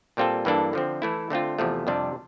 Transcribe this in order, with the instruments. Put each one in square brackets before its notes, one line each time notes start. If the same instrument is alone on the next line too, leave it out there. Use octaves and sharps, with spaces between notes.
[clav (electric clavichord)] A#2 G3 C4 F4 A4
G2 E3 A#3 D4 A4
D3 F3 C4
E3 A3 E4
D3 A3 C4 F4
E2 C3 F3 A3
F2 C3 G3 D4